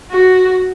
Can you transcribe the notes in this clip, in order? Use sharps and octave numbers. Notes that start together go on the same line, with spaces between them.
F#4